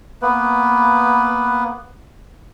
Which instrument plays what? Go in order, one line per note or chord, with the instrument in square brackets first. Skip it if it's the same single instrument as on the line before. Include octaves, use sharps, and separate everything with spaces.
[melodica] A#3 B3 B4